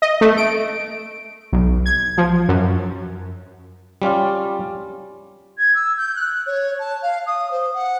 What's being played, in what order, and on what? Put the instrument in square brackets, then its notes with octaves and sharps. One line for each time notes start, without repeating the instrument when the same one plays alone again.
[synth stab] D#5
A3
D7
B1
G#6
F3
F#2
[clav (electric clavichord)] G3 C#4 F4 D5
[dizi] G#6
E6
G6
F#6
C#5
A5
F5
D#6
C5
F#5